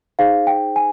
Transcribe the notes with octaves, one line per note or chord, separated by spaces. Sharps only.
D#4 G#4 C5 F5
G5
G#5